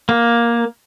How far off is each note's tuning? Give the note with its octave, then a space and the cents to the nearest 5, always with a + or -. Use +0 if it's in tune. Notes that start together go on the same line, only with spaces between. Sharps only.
A#3 +10